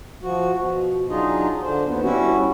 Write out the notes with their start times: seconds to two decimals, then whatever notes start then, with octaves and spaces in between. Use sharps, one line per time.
0.23 F3 F#4
0.55 B2
1.10 F#3 D4 D#4 F4 G#4 D#5
1.62 D3 D4 C5
1.85 D#2 B3
2.03 G3 C#4 E4 F#4